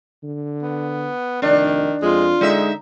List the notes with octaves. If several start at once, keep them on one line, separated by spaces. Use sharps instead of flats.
D3
B3
F1 D#3 D4
F2 G#3 F4
D3 G#3 D#4 E5